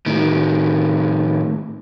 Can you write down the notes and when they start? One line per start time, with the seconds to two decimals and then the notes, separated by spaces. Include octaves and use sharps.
0.06 A2 D#3